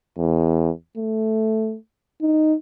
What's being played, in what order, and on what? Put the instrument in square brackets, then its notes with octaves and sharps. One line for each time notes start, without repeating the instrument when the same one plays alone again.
[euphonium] E2
A3
D#4